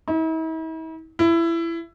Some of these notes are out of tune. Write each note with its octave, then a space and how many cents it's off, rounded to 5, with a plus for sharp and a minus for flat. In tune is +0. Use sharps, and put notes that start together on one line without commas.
E4 -45
E4 +20